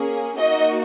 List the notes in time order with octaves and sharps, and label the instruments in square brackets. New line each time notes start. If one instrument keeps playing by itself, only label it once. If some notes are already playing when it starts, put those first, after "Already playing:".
Already playing: [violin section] A#3 C#4 G#4
A#3 D#4 F#4 D#5